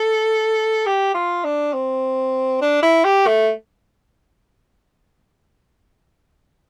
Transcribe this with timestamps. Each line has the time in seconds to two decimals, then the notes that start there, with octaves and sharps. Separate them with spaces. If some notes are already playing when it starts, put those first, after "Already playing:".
Already playing: A4
0.86 G4
1.14 F4
1.44 D4
1.73 C4
2.61 D4
2.83 E4
3.04 G4
3.27 A3